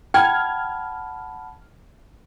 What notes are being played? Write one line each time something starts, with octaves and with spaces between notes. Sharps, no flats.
F#5 G5 A5 B5 F6 G#6